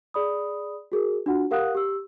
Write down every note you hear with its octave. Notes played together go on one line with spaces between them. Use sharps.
G#4 D5 B5 D#6
F#4 G#4 A#4
D4 F4 F#4 F#5
G4 A#4 F5 F#5 D#6 F#6
G4 E6